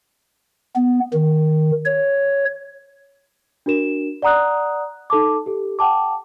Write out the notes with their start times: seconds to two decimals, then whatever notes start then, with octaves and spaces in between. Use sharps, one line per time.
0.76 B3
1.13 D#3
1.86 C#5
3.66 D4 F#4 A#4 E7
4.22 D5 F#5 A#5 D#6 F#6
5.10 D#4 A4 A5 D6
5.46 G4 A4
5.79 F#5 G5 A5 D6